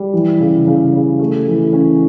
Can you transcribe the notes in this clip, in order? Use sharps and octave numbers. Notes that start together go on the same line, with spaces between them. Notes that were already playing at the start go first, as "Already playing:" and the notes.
Already playing: G3
E3
C#3
C#3
C#3
A3
E3
C#4